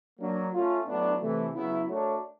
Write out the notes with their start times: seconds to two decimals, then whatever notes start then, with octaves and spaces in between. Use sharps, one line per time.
0.20 F#3 A#3 D4
0.53 A3 C#4 F4
0.87 A2 F#3 B3 D4
1.21 C3 E3 A3
1.55 C#3 F#3 B3 E4
1.88 A3 D4 F#4 A#4 C#5